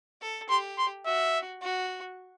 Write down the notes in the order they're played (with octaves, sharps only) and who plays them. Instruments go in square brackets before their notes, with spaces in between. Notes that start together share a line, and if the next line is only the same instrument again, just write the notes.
[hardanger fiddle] A4
[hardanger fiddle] G4 [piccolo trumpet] C6
[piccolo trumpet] C6
[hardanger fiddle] F#4 [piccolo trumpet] E5
[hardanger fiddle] F#4